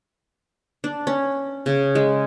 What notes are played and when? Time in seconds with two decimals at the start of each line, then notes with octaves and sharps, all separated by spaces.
0.84 D4
1.07 C#4
1.66 C#3
1.95 G#3